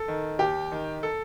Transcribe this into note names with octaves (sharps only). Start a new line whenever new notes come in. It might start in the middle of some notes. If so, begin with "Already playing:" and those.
Already playing: A4
D#3
D#2 G4
D#3
A4